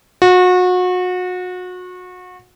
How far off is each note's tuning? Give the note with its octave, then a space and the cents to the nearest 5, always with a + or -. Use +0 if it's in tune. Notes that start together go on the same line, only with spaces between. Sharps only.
F#4 -30